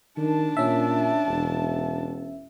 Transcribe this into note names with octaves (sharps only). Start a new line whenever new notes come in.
D#3 D4 A5
A#2 C#4 E5
E1